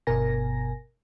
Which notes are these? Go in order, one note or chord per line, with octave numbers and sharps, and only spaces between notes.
G1 B2 A#4 G#5 A#6